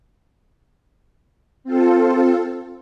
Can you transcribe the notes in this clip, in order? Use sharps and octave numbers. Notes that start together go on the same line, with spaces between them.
C4 F4 A4